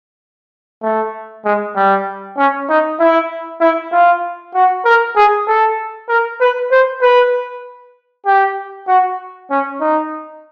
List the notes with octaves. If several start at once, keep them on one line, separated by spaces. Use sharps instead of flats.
A3
G#3
G3
C#4
D#4
E4
E4
F4
F#4
A#4
G#4
A4
A#4
B4
C5
B4
G4
F#4
C#4
D#4